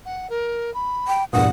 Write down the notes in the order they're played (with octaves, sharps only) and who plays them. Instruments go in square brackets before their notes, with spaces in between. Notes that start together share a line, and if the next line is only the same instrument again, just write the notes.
[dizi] F#5
A#4
B5
[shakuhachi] G5
[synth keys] E2 G2 A#2 [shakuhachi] F#5 [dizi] D#6